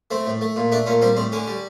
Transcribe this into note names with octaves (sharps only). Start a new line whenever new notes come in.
A3 C4
A2
A3
A#2
A3 D4
A#2 C#4
G3 C4
A2 C4
D3 C#4
G3